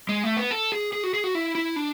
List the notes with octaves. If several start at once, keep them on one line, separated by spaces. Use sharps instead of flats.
G#3
A3
B3
A4
G#4
G#4
F#4
G#4
F#4
E4
E4
D4